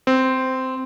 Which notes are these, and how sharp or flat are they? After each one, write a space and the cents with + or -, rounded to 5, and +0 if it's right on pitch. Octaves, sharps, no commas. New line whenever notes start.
C4 -10